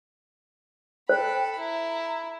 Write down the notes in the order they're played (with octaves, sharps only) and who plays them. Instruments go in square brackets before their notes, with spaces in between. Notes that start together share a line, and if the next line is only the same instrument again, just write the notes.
[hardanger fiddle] A4 B5 [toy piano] C5 [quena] G5
[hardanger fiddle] E4 [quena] A#5